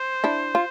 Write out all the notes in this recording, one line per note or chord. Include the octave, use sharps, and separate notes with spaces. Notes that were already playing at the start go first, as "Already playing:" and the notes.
Already playing: C5
D4 E4
F4